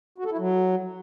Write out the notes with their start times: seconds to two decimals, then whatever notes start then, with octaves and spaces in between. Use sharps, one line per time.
0.18 F#4
0.25 A4
0.31 E4
0.38 F#3